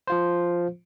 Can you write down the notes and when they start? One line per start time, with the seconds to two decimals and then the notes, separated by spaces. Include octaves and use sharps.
0.07 F3 F4 C5